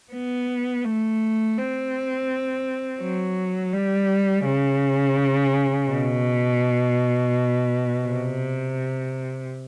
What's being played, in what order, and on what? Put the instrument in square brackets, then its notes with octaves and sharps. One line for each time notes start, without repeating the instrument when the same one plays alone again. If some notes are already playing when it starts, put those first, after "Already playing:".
[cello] B3
A3
C4
F#3
G3
C#3
B2
C3